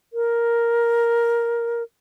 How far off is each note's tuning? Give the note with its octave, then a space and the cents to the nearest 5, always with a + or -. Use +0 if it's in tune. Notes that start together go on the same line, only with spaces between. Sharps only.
A#4 +5